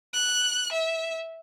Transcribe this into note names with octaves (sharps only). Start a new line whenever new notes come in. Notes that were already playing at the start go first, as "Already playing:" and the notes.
F#6
E5